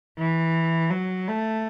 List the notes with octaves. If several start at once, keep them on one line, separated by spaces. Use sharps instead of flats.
E3
F#3
A3